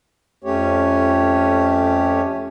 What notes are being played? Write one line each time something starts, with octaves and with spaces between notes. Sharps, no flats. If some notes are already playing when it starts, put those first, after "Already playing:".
F2 A3 C#4 G4 C#5